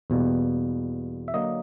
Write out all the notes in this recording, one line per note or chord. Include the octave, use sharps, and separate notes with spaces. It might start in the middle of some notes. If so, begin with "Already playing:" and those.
E2 B2 G3 A#3
E5
D3 F#3 A#3 D#5